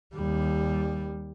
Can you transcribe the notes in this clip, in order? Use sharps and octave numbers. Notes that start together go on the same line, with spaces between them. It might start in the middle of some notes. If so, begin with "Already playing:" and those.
D#2 G3